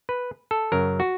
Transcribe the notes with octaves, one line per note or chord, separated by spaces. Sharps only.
B4
A4
F#2 C#3 F#3 A#4
F#4